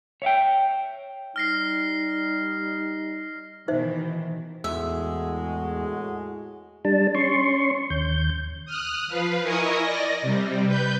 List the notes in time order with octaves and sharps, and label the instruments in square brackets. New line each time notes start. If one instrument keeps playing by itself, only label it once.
[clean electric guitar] C#5 E5 F5 G5
[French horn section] G3 D#4 [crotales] F6 A#6 C7
[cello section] B2 D#3 E3 [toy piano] D#4 C5 E5
[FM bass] E2 [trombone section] A2 F#4 G#4 [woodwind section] G#3 [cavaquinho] E5
[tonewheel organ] G3 D4 A5
C#4 C6 C#6
D#2 G6
[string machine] D#6 F6 F#6
F3 B4 F5
E4 A#4 D#5 G#5 C#6 D#6
D5 D#5 A#6
C3 G3
B4 G6